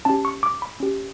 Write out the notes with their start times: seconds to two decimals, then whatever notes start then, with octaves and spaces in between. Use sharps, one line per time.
0.05 C#4 G4 A5
0.25 C#6
0.43 D6
0.62 B5
0.80 C#4 G4